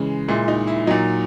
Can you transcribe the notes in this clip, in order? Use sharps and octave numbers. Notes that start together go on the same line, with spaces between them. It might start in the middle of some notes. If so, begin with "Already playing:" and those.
Already playing: C#3 E3 G#3
A#2 G#3 E4
D#4
E4
A#2 F#3 D#4